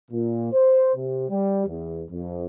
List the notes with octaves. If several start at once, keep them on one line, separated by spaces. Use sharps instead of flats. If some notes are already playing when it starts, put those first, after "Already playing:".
A#2
C5
C3
G3
E2
F2